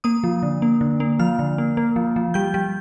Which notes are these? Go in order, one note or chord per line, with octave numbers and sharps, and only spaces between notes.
A#3 D#6
F3
D3
A#3
D3
A#3
F3 F6
D3
A#3
A#3
F3
F3
G3 G6
G3